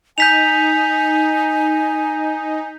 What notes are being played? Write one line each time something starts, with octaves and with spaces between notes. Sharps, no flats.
D#4 G#5 G6 B6 F7